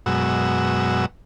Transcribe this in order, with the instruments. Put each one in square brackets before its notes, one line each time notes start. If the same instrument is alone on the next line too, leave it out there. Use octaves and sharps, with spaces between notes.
[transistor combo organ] F#2 B2 G#3 F#4 E6